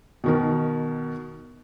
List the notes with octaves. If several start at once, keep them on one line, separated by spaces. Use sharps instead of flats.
B2 D#3 A#4